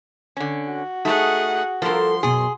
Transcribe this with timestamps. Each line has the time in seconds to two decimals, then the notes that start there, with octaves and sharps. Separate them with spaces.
0.37 D3 C#4
0.67 F#4
1.05 A3 D#4 G#4 F#5
1.82 G2 F3 A4 A#4 C6
2.23 F#2 B2 G#4